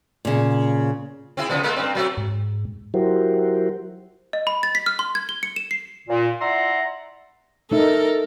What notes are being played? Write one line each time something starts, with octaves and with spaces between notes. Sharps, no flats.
A#2 C#3
C4 E4 G#4
C#3 F3 B3
G#3 A#3 A4
G2 C4
F#3 A3 C4
G#2
F#3 E4 F#4 G4 A#4 C5
D#5
B5
A6
B6
F6
C6
G#6
G7
C#7
E7
C7
A#2
E4 D5 E5 F#5 A#5 C6
A3 D#4 A4 A#4 E5